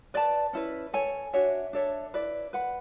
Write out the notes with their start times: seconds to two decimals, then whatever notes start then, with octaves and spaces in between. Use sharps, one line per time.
0.14 B4 D5 A5
0.53 C#4 E4 B4
0.93 A4 C#5 G#5
1.33 D4 F#4 C#5 E5
1.73 D4 A4 C#5 E5
2.14 E4 B4 D5
2.53 B4 F#5 B5